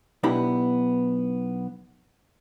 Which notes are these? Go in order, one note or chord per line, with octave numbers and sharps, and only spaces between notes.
B1 B3 D4 E4 G4 B5